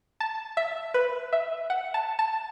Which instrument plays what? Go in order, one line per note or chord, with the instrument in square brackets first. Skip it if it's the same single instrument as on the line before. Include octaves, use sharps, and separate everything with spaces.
[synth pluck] A5
E5
B4
E5
F#5
A5
A5